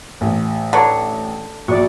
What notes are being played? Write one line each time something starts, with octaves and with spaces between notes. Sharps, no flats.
A1
D3 B4 C#5 F#5 A#5
A#1 F#4 D5 C#6